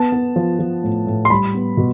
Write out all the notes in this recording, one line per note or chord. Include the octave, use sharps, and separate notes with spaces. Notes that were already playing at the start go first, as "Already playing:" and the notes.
Already playing: B3 A5
B3
F3
F3
A2
A2
C6
G3 B5
B3
B2